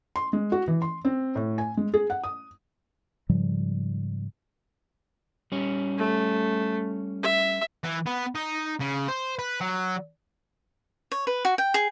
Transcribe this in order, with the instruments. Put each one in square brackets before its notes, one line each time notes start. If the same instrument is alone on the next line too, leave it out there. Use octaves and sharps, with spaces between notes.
[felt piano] C6
G#3
F#4
E3
C6
C4
A2
G#5
G#3
G#4
F#5
D#6
[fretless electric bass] G#2 C#3 F3 G3
[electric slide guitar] G3 C#4
[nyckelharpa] A3
E5
[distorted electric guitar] E3
B3
D#4
C#3
C5
B4
F#3
[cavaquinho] C#5
B4
F#4
G5
G#4